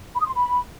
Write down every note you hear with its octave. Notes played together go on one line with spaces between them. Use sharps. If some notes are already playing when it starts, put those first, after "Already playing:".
B5
D#6
C6
B5